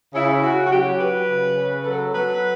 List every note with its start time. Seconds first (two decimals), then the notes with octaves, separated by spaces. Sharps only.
0.15 C#3 E4
0.43 C#3 F#4
0.66 F#4
0.71 F#3 G4
0.99 F#3 B4
1.28 C#3
1.56 C#3
1.81 B4
1.85 F#3 A4
2.14 F#3 B4